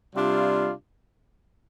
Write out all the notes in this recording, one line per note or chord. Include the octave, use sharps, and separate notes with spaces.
C3 G3 D4 F4